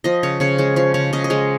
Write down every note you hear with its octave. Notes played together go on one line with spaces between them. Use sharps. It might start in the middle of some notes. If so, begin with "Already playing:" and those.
F3 D#5
C#3 C#5
C#3 C#5
G#3 C#5
F3 C#5
C#3 C#5
C#3 D#5
D#5
G#3 C#5